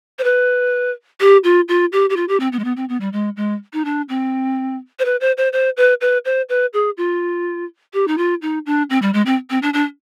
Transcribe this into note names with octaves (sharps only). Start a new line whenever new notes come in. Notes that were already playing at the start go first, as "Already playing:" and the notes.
C5
B4
G4
F4
F4
G4
G4
F4
G4
C4
B3
G#3
B3
C4
B3
G3
G#3
G#3
D#4
D4
C4
C5
B4
C5
C5
C5
B4
B4
C5
B4
G#4
F4
G4
D#4
F4
D#4
D4
C4
G3
G#3
C4
C4
D4
D4